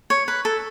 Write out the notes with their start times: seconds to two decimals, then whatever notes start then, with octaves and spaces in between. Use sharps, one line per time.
0.10 C#5
0.28 B4
0.45 A4